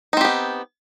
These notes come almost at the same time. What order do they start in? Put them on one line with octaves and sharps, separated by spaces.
D#4 C4 G4 B3